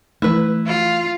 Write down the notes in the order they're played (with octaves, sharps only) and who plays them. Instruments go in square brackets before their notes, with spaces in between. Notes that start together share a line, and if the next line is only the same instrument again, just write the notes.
[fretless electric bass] E3 A3 [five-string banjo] E4 B4
[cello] F4